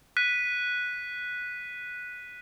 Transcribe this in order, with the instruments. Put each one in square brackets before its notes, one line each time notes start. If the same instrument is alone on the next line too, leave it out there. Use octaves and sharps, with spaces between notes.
[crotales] F#6 B6 D#7